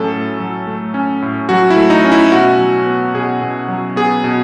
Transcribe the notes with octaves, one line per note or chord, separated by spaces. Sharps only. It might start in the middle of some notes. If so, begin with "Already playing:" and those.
Already playing: A2 F#3 A3 C#4 A4
A2
F#3
A3
C#4
A2
F#3 F#4
E4
A3
D#4
C#4
E4
B2 F#4
F#3
B3
B2 G#4
B2
F#3
B3 G#4
B2